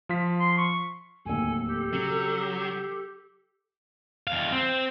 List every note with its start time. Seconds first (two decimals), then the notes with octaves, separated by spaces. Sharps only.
0.09 F3 F4 B6
0.40 C6
0.58 C#6
1.25 D1 D#2 A4 G#5
1.66 G4
1.93 C#3 F#3
4.27 E2 F5
4.52 C4